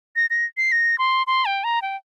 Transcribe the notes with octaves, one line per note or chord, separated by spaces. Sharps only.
A#6
A#6
C7
A#6
C6
C6
G5
A#5
G5